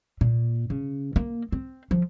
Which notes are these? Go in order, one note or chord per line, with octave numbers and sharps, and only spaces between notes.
A#2
C#3
A#3
C4
F3